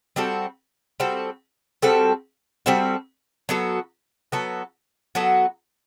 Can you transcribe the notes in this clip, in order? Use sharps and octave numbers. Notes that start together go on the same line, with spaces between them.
G3 C4 F#4 A4
G3 C4 F#4 A4
G3 C4 F#4 A4
G3 C4 F#4 A4
F#3 B3 F#4 A4
F#3 B3 F#4 A4
F#3 B3 F#4 A4